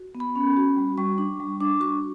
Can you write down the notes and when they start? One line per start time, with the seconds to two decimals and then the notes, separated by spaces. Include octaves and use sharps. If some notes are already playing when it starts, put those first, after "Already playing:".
Already playing: F#4
0.15 B3
0.20 B5
0.36 C#4
0.57 F#4
0.76 G3
0.98 G3 C#6
1.18 D4
1.40 G3
1.60 D4 D6
1.80 F#4 C#6